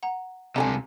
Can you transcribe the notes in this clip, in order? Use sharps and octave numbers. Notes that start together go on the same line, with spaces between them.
F#5 A#5
C#2 C3 D4 A4 G#5 A#5